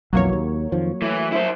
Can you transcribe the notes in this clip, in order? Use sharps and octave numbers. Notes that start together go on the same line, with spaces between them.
B1 F2 E3 F#3 A#3 C#5
D#2
F2 D#3 F3
E3 A3
E4 C5